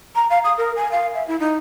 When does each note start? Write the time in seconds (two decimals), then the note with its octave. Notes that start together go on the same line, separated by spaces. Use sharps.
0.16 A#5
0.30 F5
0.44 D#6
0.58 A#4
0.76 G#5
0.92 F5
1.14 E5
1.28 E4
1.40 D#4